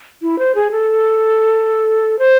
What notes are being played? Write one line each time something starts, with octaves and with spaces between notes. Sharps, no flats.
E4
C5
G#4
A4
C5